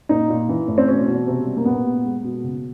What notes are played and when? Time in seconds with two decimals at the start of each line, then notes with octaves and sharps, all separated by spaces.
0.09 A#2 D#4
0.29 A#2
0.49 E3
0.68 A2
0.78 C4
0.88 B2 C#4
1.07 B2
1.27 C3
1.46 G3
1.57 A#3
1.65 A#2 B3
1.85 A#2
2.05 G#3
2.24 B2
2.44 C#3